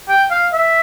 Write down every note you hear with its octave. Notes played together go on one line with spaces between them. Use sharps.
G5
F5
E5